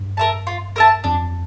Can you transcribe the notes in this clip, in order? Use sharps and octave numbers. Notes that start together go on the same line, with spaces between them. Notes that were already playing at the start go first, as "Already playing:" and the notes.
Already playing: G2
A#4 E5 A5
F4
A#4 E5 A5
F2 D4